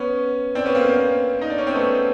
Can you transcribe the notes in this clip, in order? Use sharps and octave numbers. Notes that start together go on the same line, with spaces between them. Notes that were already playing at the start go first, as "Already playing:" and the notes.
Already playing: B3 C#4
C4 D4
B3 C#4
A#3 C4
A#3 C4
D#4
D4
C#4
C4
A3 B3